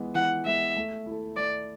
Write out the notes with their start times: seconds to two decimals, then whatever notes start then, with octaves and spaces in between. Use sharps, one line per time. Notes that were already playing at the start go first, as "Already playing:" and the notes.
Already playing: E3 G#3 B3
0.15 E3 F#5
0.45 G#3 B3 E5
0.77 A3
1.06 E4
1.12 A4
1.37 A3 D5